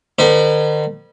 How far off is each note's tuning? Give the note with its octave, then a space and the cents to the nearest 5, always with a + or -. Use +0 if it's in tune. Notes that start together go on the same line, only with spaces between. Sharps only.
D#3 -45 C5 -45 B5 -30